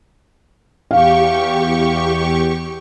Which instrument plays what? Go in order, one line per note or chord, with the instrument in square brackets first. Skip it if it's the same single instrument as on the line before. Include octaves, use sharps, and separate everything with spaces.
[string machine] E2 G4 C#6 [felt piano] F5